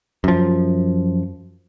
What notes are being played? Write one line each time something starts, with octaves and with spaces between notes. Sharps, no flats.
F#2 F3